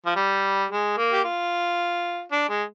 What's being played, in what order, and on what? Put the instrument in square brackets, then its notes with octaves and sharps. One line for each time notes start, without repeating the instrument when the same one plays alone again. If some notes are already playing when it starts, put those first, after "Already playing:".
[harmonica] F3
G3
G#3
A#3
G4
F4
D4
G#3